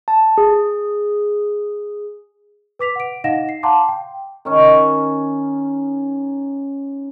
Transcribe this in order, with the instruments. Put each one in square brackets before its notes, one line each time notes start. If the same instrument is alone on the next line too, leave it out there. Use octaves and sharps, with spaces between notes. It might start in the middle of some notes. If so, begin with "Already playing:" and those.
[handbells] A5
G#4
[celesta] B4 D6 B6 F7
F#5 D7
D#4 D#5 F5 F#5 A#6 E7
C7
F5 F#5 A5 A#5 C6 D6
G5
[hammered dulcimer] D#3 C#4